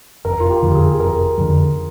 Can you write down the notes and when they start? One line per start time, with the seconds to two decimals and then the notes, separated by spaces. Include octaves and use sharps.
0.25 F1 A#4
0.40 F4
0.50 G4
0.63 F2 D3
0.76 G#4
1.00 F1 A#4
1.38 F2 D3